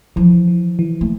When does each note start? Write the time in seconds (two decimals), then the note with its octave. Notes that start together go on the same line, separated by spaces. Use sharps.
0.16 E3 F3
0.48 E3
0.79 E3
1.01 A3